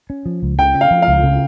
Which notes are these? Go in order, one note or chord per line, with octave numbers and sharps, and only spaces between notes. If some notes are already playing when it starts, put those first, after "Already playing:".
C#4
F3
C#2
C#3 G5
C#4
F5
F3
F5
C#2
C#3